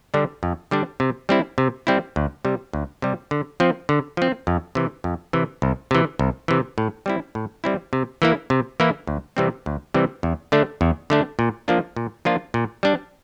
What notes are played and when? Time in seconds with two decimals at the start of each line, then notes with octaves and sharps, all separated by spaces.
0.14 D3 G3 D4
0.43 F2
0.71 D3 G3 D4
1.00 C3
1.29 G3 C4 E4
1.58 C3
1.87 G3 C4 E4
2.16 D2
2.45 C3 G3
2.73 D2
3.02 C3 G3
3.31 D3
3.60 F3 C4
3.89 D3
4.17 F3 C4
4.47 F2
4.75 C3 E3
5.04 F2
5.33 C3 E3
5.62 C2
5.91 C3 E3
6.19 C2
6.48 C3 E3
6.78 A2
7.06 G3 C4 E4
7.35 A2
7.64 G3 C4 E4
7.93 C3
8.22 E3 A#3 E4
8.50 C3
8.80 E3 A#3 E4
9.07 D2
9.37 C3 E3 G3 C4
9.66 D2
9.94 C3 E3 G3 C4
10.23 E2
10.52 D3 A3 D4
10.81 E2
11.10 D3 A3 D4
11.39 A#2
11.68 F3 A#3 D4 F4
11.96 A#2
12.25 F3 A#3 D4 F4
12.54 A#2
12.83 G3 D4